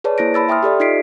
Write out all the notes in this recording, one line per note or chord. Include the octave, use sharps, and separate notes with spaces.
G#4 B4 C#5 D5 A5
A#3 E4 C5 A#6 D7
A5 B5 E6 A6
E5 G5 C6 D#6 F6
G4 A4 D5 E5
D#4 F4 D#5 B6 C7 D7